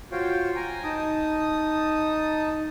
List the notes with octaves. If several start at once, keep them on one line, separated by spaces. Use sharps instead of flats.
F4 F#4 C5 C#5 F5 G5
G5 G#5 A#5
D#4 A5 D#6